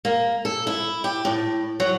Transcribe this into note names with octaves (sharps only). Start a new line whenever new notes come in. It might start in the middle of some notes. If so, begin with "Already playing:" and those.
A#3
A4
E4
G4
A2
F#3